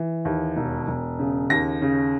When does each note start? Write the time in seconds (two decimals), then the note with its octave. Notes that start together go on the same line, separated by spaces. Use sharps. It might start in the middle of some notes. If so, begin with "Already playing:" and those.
Already playing: E3
0.25 D#2
0.56 E1
0.88 E1
1.19 C#3
1.50 D#2 A#6
1.82 C#3